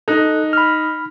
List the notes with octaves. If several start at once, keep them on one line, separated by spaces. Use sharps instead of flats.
D#4 A4 F#6
B5 F6